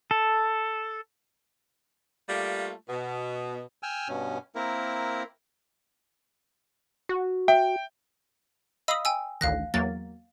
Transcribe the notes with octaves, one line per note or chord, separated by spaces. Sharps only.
A4
G3 A3 A#3 F4
B2
G5 G#5 E6 F6
G2 B2 C#4
A#3 C4 E4 A#4
F#4
E5 G5
D#5 F5 B5 D#6 E6
G5 G#5 E6
A1 D2 D#3 F5 F#6 A#6
E2 F#3 A#3 A6